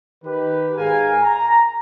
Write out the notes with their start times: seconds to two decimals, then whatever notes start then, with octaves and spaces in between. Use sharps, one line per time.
0.24 D#3 G4 B4
0.77 G#2 G#4 A#4 F5 G#5
1.22 A#5